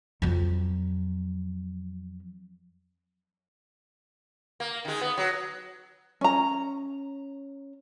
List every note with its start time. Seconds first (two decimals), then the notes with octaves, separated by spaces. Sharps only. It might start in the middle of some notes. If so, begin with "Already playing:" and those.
0.22 F2 F#3
4.60 A#3
4.85 D#3 G#3
5.01 B3
5.18 F#3
6.21 C#4 A#5